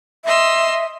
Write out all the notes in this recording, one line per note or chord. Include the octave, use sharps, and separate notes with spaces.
D#5 E5 C6 E6